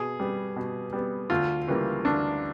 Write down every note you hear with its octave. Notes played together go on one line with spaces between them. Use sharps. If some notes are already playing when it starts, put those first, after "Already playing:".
Already playing: B2 G#4
G3 B3
B2
G3 B3
D2 F4
C#3 E3 G3 A#3
D2 D4